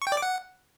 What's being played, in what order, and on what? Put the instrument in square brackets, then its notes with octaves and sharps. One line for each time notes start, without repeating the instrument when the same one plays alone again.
[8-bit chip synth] C#6
G5
D5
D6
F#5